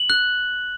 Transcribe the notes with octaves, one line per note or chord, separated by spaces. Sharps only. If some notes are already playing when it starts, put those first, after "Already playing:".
Already playing: F#7
F#6